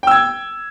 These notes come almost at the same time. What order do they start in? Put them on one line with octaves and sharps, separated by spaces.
G5 E6 G#6